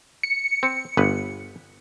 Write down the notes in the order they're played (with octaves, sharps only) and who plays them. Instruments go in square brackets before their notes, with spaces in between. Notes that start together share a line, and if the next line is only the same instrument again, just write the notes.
[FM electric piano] C#7
[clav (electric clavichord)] C4
G1 B4